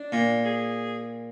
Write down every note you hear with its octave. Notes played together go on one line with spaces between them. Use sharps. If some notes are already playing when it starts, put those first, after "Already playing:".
Already playing: D4
A#2
G#4